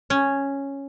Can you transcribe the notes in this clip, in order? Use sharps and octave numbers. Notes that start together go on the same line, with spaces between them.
C#4